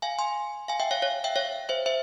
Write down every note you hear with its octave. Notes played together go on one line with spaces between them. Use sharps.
F5 G#5
G#5 C6
F5 G#5
E5 G5
C#5 F5
C#5 F5
E5 G5
C#5 F5
C5 E5
C5 E5